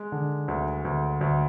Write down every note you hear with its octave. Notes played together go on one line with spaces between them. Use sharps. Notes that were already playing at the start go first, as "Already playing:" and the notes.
Already playing: G#3
D3
D2
D2
D2